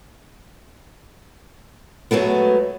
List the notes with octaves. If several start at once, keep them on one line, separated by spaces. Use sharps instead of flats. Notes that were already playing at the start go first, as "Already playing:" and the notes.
F#3 G#3 A3 B3